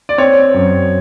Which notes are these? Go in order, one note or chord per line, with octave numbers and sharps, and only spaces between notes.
D5
C4 C#5
F#2